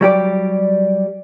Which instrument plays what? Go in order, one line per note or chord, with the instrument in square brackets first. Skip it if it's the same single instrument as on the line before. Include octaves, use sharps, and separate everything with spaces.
[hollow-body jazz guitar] F#3 G3 G4 D5